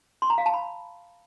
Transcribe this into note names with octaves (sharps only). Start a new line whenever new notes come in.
C6
A#5
F5
A5
B5